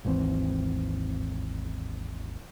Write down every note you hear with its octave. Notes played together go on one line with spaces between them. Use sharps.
G#1 D#2 E3 C4